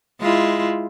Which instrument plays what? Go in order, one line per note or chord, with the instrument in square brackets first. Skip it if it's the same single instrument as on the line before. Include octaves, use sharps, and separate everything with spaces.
[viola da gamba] G#3 E4 F4